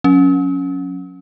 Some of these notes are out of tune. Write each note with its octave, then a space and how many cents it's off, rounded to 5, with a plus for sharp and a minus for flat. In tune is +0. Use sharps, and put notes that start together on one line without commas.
F#3 -35 C#4 +0